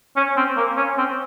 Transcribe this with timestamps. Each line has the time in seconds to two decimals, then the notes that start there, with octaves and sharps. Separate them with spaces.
0.16 C#4
0.37 C4
0.57 A#3
0.77 C#4
0.98 C4